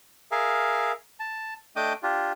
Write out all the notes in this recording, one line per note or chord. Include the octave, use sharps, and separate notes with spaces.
G#4 A#4 E5 F5
A5
A3 D4 D#5 G5 D6 D#6
D4 F4 G4